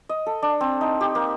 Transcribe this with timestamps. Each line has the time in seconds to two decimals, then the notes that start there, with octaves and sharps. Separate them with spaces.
0.09 D#5
0.26 A4
0.42 D4
0.61 C4
0.81 D#4
1.01 G4
1.15 A#3